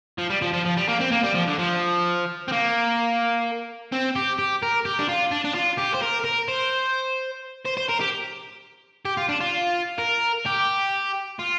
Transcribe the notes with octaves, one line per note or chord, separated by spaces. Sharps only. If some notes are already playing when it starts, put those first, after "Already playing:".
F3
G3
F3
F3
F3
G3
A#3
C4
A#3
G3
F3
D3
F3
C4
A#3
C4
G4
G4
A#4
G4
D4
F4
D4
D4
F4
G4
C5
A#4
A#4
C5
C5
C5
A#4
G4
G4
F4
D4
F4
A#4
G4
F4